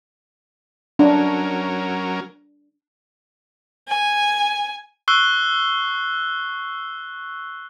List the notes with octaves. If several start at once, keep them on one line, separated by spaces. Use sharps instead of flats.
F#3 C#4 D4 A#4
G#5
C#6 E6 F#6 C7 G7